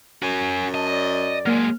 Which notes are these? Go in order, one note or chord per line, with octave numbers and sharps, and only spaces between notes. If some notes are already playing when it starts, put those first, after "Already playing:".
F#2 F#4 G#5
D#5 A5
D5
F#3 G#3 A#3 F6